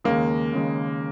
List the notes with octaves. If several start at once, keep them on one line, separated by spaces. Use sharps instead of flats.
D#2 C#3 G#3 A#3
D#2 C#3 G#3